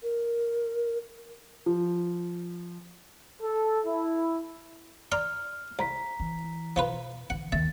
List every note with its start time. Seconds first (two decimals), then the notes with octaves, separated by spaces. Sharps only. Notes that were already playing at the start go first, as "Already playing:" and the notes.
0.03 A#4
1.66 F3
3.41 A4
3.86 E4
5.12 D5 A#5 C6 F6
5.79 C2 A#5 B6
6.20 E3
6.76 B2 F3 F4 B4
7.30 D3 E3 F#5
7.52 D#2 D#3 E5 A6